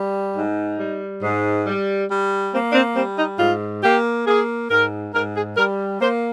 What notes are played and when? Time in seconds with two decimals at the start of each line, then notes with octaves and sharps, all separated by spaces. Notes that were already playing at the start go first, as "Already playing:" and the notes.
Already playing: G3
0.36 G#2 D#4
0.79 G3
1.23 G#2
1.66 G3
2.09 G3
2.53 A#3 C4
2.70 D4
2.75 C4
2.96 G3 C4
3.18 D#4
3.39 G#2 F4
3.83 A#3 G4
4.27 A#3 G#4
4.70 G#2 A#4
5.14 G#2 A#4
5.36 G#4
5.57 G3 A#4
6.01 A#3 C5